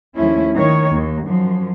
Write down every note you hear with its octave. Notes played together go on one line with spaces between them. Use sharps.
D#2 F3 A3 C#4 E4
D#3 C#5
D#2
F#2 F3